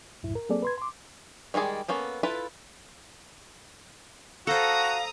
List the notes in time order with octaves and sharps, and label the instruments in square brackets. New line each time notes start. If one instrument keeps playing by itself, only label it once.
[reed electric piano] C2 F#2 A2 E4
A#4
F#3 A#3 C4 G#4 A4 D5
B4 C6 G#6
C6 D6
[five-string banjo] D#3 G3 G#3 G#4 D5
A#3 B3 C#4 A4
E4 F4 A4 B4
[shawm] F#4 [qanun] A4 C5 [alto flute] F5 [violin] A#5 D#6